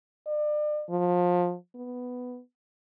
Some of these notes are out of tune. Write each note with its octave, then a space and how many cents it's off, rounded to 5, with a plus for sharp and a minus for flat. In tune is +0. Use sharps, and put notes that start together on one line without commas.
D5 +35
F3 +25
B3 +5